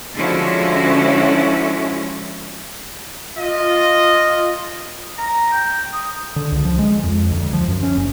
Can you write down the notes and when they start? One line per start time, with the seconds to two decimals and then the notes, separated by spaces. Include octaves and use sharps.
0.15 D3 F3 G#3 C#4 E4 F#4
3.38 F4 D#5
5.18 A#5
5.52 G5
5.93 D#6
6.36 D3
6.52 C#2
6.65 F3
6.79 G#3
7.04 F2
7.31 D2
7.53 F3
7.68 F#2
7.83 C#4
7.96 F#1